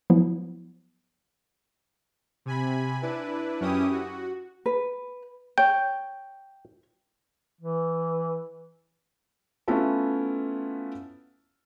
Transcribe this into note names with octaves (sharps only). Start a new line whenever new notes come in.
F3 F#3 B3 E4
C3 G#5 B5
D4 E4 B4
F#2 C#4 E4 G4 D#6
F#4
B4
C#5 G5
E3
A3 B3 C#4 E4 F4 A4